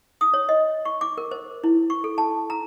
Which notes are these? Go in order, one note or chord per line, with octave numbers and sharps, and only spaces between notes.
D#6
C#5
D#5
C#6
D6
A#4
C5
E4
C#6
A4
A5
A#5